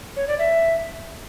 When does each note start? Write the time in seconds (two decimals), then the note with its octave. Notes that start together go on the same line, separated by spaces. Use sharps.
0.17 C#5
0.28 D5
0.39 E5